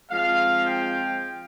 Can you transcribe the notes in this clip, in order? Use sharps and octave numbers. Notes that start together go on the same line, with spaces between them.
F3 G#3 C4 F5
G5